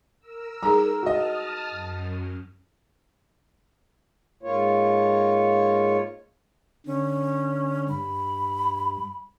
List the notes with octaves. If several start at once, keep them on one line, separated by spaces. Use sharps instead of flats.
A#4 E6
G3 D#4 G#4 A#5
F#4 D#5 A5 D#6 F6
F#2
G#2 A#3 F4 C#5
D3 C#4
G2 B5